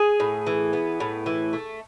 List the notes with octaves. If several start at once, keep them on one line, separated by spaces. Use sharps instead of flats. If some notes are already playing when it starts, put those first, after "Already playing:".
Already playing: G#4
A2
E3
B3
A2
E3
A3